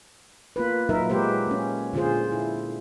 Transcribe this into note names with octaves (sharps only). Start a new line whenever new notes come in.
A#3 F4 B4
A#2 F#3 A#3 D#4 A#4 E5
G#3 G4 B4 C5
A#3 C#4
A#2 D3 F4 G#4 C5
E4